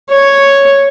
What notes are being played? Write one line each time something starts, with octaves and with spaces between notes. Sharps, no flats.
C#5